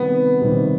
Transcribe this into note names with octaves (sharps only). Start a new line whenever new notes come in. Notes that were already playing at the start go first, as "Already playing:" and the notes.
Already playing: C3 D#3 G3 B3
C3 D#3 G3